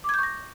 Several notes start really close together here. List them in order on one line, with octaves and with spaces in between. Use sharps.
D6 G#6 G6 C#6 A#6